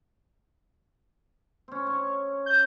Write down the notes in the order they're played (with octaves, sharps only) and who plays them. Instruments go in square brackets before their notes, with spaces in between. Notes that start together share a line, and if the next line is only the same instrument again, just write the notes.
[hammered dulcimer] C4 C#4
C#5 C#6
[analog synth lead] G6